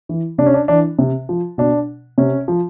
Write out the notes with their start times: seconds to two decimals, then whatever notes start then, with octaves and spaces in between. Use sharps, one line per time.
0.09 E3
0.38 C3 D4
0.46 C#4
0.54 D4
0.68 E3 D4
0.99 C3
1.29 F3
1.58 B2 D4
2.18 C3 C#4
2.48 F3